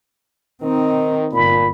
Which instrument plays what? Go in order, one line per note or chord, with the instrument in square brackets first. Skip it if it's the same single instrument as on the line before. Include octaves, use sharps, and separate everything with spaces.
[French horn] D#3 [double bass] C4 D#4
[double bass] G1 [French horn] A#2 [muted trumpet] B5